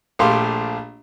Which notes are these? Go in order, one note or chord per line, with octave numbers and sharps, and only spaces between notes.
A#1 A3 G4 F5 C6